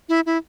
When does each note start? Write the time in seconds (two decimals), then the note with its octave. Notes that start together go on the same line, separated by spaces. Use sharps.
0.09 E4
0.26 E4